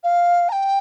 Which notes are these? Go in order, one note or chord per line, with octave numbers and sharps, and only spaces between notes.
F5
A#5
G5